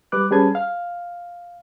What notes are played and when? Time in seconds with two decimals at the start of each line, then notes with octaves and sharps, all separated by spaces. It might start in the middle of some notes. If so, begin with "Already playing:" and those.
0.12 G3 B4 D6 F#6
0.31 G3 C#4 G#4 B4 A5 G#6
0.55 F5